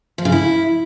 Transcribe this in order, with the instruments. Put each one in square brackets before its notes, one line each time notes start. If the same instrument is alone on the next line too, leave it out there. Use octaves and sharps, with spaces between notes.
[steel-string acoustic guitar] F3
C#3
E4